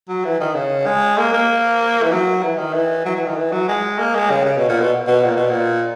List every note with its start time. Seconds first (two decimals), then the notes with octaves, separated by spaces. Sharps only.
0.09 F#3
0.25 E3
0.40 D#3
0.55 C#3
0.86 G#3
1.18 A#3
1.33 A#3
2.03 E3
2.12 F#3
2.43 E3
2.58 D#3
2.74 E3
3.05 F#3
3.16 E3
3.26 D#3
3.36 E3
3.52 F#3
3.68 G#3
3.99 A#3
4.15 G#3
4.30 C#3
4.46 C#3
4.57 B2
4.69 A#2
4.81 B2
5.07 B2
5.24 A#2
5.37 B2
5.50 A#2